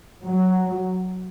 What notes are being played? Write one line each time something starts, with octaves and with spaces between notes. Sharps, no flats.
F#3